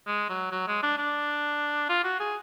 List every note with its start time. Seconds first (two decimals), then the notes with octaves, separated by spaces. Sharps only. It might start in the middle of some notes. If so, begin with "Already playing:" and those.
0.07 G#3
0.29 F#3
0.52 F#3
0.68 G#3
0.83 D4
0.98 D4
1.89 F4
2.04 F#4
2.20 G#4